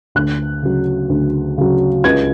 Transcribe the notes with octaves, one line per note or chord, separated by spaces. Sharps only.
D2 F#6
C#3 F#3
D2
C#3 F#3
C#2 G#6